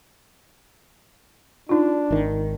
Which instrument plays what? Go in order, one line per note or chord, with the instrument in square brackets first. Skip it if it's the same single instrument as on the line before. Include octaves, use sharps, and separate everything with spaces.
[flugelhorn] D4 [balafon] D#4 F4
[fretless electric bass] G#1 D#3